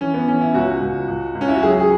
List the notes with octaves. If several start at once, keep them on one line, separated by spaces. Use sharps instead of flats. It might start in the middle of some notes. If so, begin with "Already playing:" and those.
E3 C#4
B3
E3 C#4
E4
C#2 F#4
C#2
C#2
C#2
C#4
E4
F#4
F#3 G#4
G#4